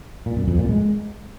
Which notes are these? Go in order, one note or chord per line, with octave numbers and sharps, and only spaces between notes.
A#2
F#2
F2
A#2
G#3